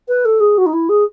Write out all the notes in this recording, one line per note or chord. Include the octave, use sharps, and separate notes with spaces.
B4
A4
G#4
F#4
D#4
E4
G#4